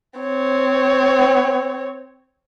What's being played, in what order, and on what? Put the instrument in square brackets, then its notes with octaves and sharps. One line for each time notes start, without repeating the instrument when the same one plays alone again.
[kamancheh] C4 C#5